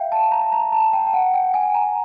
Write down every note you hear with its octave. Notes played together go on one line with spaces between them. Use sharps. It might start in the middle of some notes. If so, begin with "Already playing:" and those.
Already playing: E5 F5 G5
A5
A#5
A#5
A5
G5
G5
F#5
G5
G#5
A#5